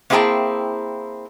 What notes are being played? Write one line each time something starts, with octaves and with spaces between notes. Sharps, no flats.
A#3 C4 E4 G#4 G5 A5